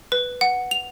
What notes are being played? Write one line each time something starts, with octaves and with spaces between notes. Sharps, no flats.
B4
F#5
F7